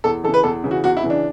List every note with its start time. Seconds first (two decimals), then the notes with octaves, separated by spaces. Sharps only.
0.04 E2 A4
0.24 E3 A4
0.28 C#3
0.34 B4
0.43 E2 A4
0.64 C#3 E3
0.71 F#4
0.84 E2 F#4
0.97 E4
1.03 C#3 E3
1.10 D4